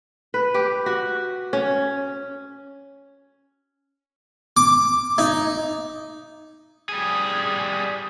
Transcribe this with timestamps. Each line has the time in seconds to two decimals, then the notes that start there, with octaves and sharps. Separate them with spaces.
0.34 B4
0.54 G4
0.86 F#4
1.53 C#4
4.57 D6
5.18 D#4
6.89 G3 G#4